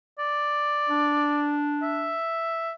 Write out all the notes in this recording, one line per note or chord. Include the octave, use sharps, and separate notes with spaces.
D5
D4
E5